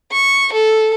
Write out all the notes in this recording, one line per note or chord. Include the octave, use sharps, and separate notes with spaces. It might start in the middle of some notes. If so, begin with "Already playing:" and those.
C#6
A4